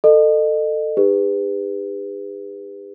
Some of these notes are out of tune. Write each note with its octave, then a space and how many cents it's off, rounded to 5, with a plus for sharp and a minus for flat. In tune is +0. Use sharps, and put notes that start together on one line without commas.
A4 +15 D#5 -35
D#4 -15 G4 +45 B4 +15